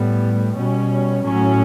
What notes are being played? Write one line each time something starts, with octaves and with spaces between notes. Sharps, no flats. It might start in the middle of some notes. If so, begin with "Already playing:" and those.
Already playing: A2 G3 B3
B2 G3 C#4
A2 F#3 A3 C#4